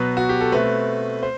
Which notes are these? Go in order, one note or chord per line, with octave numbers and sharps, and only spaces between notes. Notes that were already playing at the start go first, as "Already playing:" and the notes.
Already playing: B2 F#3 B3 B4
F#4
G4
A4
B2 A3 C4 B4
C5